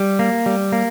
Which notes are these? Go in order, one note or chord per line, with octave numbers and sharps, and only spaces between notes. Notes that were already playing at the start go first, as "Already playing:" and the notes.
Already playing: G3
A#3
G3
A#3